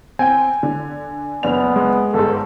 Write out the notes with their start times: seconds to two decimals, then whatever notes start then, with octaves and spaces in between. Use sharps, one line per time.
0.19 C4 G5 G#5
0.63 D3
1.43 F#1 B3 D4 F7
1.76 G#3
2.14 G1 G#2 A4